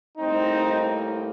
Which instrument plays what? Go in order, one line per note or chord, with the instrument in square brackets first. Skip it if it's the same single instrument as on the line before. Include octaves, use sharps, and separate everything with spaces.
[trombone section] A2 G3 A#3 C4 D#4